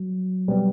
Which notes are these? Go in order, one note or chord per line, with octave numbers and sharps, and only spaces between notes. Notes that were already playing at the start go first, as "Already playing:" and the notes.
Already playing: F#3
B2 G3 B3